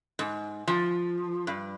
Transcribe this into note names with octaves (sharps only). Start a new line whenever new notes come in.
G#2
F3
G2